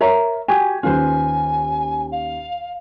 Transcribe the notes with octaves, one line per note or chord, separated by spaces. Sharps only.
A#4 C#5 E5 A#5
F#4 G4 G#5
D#2 C#4 F4 B4 C5 G#5
F5